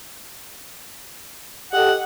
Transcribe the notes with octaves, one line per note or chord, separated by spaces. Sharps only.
G4 A4 D#5 F#5